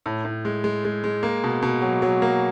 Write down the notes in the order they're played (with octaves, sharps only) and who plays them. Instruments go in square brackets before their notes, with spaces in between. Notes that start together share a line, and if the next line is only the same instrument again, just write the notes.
[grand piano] A2
A2
G#3
G#3
G#3
G#3
A#3
B2
B2
F#3
F#3
A#3